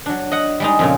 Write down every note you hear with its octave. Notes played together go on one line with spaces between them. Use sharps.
F#3 D4
D#5 F#5
G3 G#3 D#4
F2 A#2 C#3